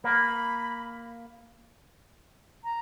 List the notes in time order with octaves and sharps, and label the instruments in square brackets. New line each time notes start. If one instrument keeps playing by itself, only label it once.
[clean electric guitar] A#3 [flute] B5
[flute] A#5